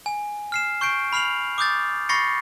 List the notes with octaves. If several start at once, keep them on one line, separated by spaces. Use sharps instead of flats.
G#5
F6 C7 E7
C#6 G6 C7 D7
B5 F6 C7 F7 F#7
D6 D#6 G6 A6
B5 C#6 A6 A#6 C7 C#7